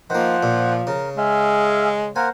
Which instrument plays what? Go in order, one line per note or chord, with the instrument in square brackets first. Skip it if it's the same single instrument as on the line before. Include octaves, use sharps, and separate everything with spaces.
[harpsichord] D#3 A#3 [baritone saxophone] F3 [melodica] C5 F#5
[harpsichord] A#2
[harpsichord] C#3 [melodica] A#4
[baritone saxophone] G#3 [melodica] G#4 E5 F5
[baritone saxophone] A#3 [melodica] A#4 C5 F#5 [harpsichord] G#5